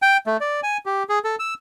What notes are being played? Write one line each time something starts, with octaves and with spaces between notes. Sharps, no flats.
G5
A3
D5
G#5
G4
G#4
A4
E6